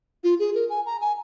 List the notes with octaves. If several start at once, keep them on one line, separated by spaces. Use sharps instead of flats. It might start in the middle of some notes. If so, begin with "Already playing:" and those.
F4
G#4
A#4
G#5
A#5
G#5